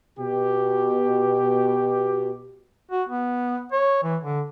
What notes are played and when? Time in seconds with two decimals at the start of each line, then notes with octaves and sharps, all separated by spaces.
0.18 B2 G4
2.91 F#4
3.09 B3
3.72 C#5
4.03 E3
4.24 D3